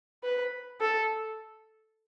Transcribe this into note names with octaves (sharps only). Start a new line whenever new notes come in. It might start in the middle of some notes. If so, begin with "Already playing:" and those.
B4
A4